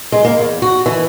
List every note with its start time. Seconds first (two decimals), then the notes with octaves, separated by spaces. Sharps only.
0.12 G#3
0.25 A#3
0.39 E2
0.62 F#4
0.86 E3